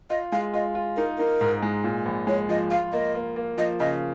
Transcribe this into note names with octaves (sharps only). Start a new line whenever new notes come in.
F4 D#5
G#3 F5
F4 D#5
F4
D#4 A#4
D#4 A#4
G#2
G#3
A#2
A#1
G#3 C#5
F3 D#5
F4 F5
A#3 D#5
A#3
A#3
F3 D#5
C#3 D#5